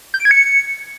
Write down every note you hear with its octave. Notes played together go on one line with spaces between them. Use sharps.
G6
D7
G#6
C#7